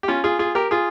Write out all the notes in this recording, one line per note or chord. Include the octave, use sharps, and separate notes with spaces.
G4
C#4 F4
F4 G#4
F4 G#4
G4 A#4
F4 G#4